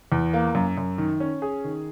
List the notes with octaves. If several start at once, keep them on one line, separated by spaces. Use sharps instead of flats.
E2
A#3
F#2
F#2
D#3
C#4
G#4
D#3